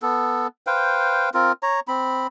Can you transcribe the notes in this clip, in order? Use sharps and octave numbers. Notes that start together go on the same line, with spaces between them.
B3 A4
B4 C5 F5 G5
C4 F4 A#4
C#5 A#5
C4 B5